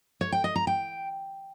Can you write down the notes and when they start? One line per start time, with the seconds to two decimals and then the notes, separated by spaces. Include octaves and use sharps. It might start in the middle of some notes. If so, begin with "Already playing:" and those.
0.21 C#5
0.32 G5
0.44 D#5
0.56 A#5
0.67 G5